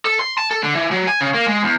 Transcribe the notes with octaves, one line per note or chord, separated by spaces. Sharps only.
A4
C6
A5
A4
D3
E3
F#3
G#5
C#3
A#3
G#3
E2